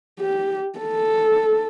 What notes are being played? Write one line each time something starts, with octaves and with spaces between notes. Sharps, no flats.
G4
A4